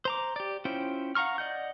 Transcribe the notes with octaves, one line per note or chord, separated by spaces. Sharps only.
C5 A#5 D6
G4 D5
C#4 E4 F4 C5 G5
F5 F#5 A#5 C#6 F6
D5 D#5 F#5 G6